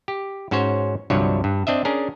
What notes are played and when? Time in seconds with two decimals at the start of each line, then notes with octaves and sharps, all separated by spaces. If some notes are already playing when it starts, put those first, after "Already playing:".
0.08 G4
0.51 G#2 C#4 F#4 C5 C#5
1.10 C2 G2 D3 F3 F#3 C#5
1.44 G2
1.67 C4 D4 D#5 E5
1.85 C#4 D4 G#4 A#4